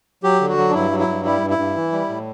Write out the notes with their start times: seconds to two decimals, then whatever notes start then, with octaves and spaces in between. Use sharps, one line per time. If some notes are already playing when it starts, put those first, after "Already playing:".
0.23 F#3 G4
0.41 D3
0.49 F#4
0.57 F#3
0.69 D4
0.74 G2 E4
0.91 F#3
1.00 E4
1.08 G2
1.25 G3 E4
1.41 G2
1.50 E4
1.58 G2
1.75 E3
1.92 G3
2.09 A2